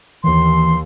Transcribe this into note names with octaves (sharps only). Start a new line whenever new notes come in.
D#2 E3 C6